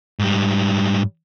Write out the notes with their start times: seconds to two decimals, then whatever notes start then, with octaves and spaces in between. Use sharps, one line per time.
0.19 G#2 G3